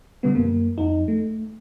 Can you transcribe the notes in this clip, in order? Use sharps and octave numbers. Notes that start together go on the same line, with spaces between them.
B2 D3 G3 B3
F#2 A#3
F2 D#4
A3